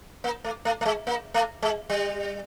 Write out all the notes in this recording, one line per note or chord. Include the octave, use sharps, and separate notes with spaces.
A#3
A3
A3
A3
G#3
A#3
A3
G#3
G3